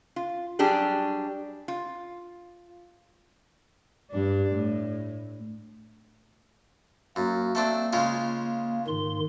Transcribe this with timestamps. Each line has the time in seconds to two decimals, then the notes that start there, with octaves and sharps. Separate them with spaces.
0.16 F4
0.59 F#3 G3 D4 G4 G#4
1.68 F4
4.11 G2 D4
4.52 A2
7.16 F#2 A#3
7.55 A3 C4 D4
7.93 C#3 G#3 F4
8.87 G#2 D#3 C6